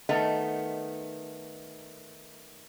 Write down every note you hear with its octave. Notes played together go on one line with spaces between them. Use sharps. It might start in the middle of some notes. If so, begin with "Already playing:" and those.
D#3 A3 B3 D#4